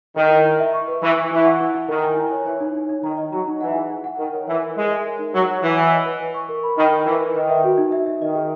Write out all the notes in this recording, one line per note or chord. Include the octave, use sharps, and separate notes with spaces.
D#3 A#4
E4
E4
E5
C#6
B4
E3 C#6
C#6
E3 E4
F#5
E4
E4
D#3 A#4
G#5
E4
C#5
E3 C#5
D#4
D#4
D#4
D#3 A#5
D#5
F#3 A#5
D#4
E3 F#5
G#4
G#4
F#5
D#3 A#4
C#5
E3 C#5
A#4
G#3 C#5
E5
A#4
D#4
F#3 C#5
C#5
E3 C#5
F#5
D#5
B4
B4
C#6
A#4
B5
D#3 B5
A#4
E3 B4
B4
D#3 B4
E5
F#4
D#4
E5
E5
D#3 D#5
G#4